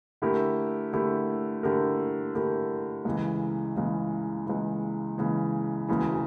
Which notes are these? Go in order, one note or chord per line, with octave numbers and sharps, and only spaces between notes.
D3 A3 E4 G4 A#4
D3 A3 E4 G4 A#4
D3 A3 E4 G4 A#4
D3 A3 E4 G4 A#4
C#2 C#3 E3
C#2 C#3 E3
C#2 C#3 E3
C#2 C#3 E3
E1 D2 C#3 E3